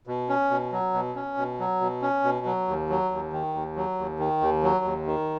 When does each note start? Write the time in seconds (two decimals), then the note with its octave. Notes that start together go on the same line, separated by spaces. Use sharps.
0.07 B2
0.29 C#4
0.51 B2
0.72 F#3
0.94 B2
1.15 C#4
1.37 B2
1.59 F#3
1.81 B2
2.02 C#4
2.24 B2
2.46 F#3
2.68 D#2
2.90 F#3
3.11 D#2
3.33 D#3
3.54 D#2
3.76 F#3
3.98 D#2
4.19 D#3
4.41 D#2
4.63 F#3
4.85 D#2
5.06 D#3